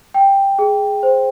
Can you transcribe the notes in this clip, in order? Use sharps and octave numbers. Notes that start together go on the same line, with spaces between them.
G5
G#4
C5